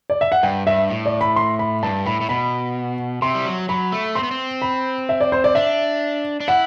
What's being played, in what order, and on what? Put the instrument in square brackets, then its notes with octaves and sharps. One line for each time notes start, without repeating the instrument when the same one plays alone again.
[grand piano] D5
E5
F#5
[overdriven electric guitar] G2 [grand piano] G5
[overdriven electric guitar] G2 [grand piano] E5
[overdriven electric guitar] A2
[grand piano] D5
B5
C6
B5
[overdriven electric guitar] G2 [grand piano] A5
[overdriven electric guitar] A2 [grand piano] B5
[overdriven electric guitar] A2
[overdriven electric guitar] B2 [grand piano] B5
[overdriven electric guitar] C3 [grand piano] C6
[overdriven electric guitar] G3
F#3
[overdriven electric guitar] F#3 [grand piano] B5
[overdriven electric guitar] A3
[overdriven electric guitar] C4 [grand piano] C6
[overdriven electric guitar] B3
C4
[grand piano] B5
E5
D5
C5
D5
[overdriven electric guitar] D4 [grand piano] E5
[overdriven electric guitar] D4
[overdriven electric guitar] E4 [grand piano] F#5